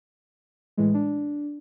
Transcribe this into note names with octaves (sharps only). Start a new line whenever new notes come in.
A2 E3 G#3
D4